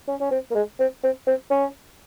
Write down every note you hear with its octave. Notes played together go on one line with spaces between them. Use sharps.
C#4
C#4
C4
A#3
G#3
C4
C4
C4
C#4